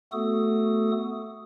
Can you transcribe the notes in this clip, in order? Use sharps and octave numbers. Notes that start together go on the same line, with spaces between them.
A3 B3 F#4 A4 D#6